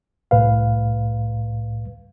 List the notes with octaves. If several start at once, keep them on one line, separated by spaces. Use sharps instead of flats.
C2 A2 B4 F5